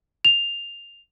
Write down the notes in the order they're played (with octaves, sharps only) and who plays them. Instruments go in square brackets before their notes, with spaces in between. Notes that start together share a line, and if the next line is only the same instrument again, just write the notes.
[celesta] F7